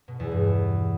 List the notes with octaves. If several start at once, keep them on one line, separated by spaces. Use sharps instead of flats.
B2
E2
G2